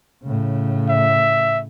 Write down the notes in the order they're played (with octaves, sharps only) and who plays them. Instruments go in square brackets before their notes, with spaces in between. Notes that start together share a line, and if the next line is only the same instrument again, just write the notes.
[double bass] A2 C#3
[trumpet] E5